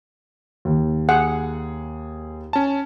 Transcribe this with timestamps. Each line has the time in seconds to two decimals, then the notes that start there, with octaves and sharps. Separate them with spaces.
0.65 D#2
1.09 G#4 F#5
2.53 C#4 A5